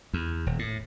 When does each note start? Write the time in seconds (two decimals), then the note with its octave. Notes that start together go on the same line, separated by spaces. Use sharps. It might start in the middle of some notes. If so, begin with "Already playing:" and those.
0.14 E2
0.46 D#1
0.59 A2